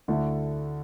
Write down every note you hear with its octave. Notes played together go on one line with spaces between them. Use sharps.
D2 D3 A3 E4